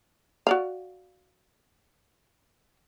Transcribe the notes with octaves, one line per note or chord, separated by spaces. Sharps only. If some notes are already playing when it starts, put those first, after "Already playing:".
F#4 D5 F5